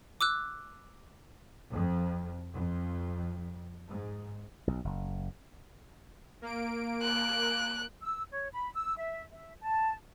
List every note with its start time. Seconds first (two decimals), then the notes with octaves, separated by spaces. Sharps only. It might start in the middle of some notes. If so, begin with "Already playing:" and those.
0.21 D6 E6 F#6
1.72 F2
2.54 F2
3.90 G#2
4.67 B1
4.84 F#1
6.42 A#3 D7
7.02 F#6
8.02 E6
8.31 C#5
8.52 B5
8.74 E6
8.97 E5
9.32 E5
9.61 A5